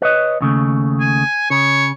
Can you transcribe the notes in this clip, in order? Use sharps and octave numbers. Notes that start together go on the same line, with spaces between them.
B4 C#5 D#5
D#2 C#3 A3
G#5
C#3 C#5